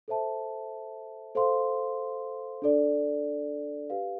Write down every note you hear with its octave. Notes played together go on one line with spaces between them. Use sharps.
A4 C5 E5 A5
A4 C5 F5 C6
D4 A4 D5
G4 B4 F5